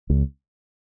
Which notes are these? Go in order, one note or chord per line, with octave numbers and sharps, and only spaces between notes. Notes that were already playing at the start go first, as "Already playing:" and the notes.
C#2